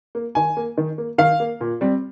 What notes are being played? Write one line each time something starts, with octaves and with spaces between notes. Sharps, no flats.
A#3
D#3 G#5
A#3
D#3
A#3
D#3 F5
A#3
A#2
G3 C4